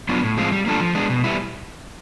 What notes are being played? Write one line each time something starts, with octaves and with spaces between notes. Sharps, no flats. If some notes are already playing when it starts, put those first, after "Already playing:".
F#3 B3 D4 F4
A2
F3 G#3 C4 F4
G3
A#3 D4 F4 A4
F3
G#3 B3 D4
B2
G3 B3 E4